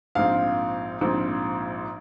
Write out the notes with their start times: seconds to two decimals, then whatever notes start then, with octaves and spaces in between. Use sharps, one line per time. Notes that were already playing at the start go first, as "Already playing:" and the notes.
0.15 A#1 G#2 F3 C4 F5
1.01 A#1 G#2 F3 C4